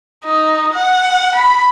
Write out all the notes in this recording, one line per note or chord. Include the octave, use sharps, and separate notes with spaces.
D#4
F#5
B5